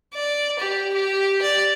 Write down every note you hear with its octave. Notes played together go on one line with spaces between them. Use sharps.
D5
G4
G4
D5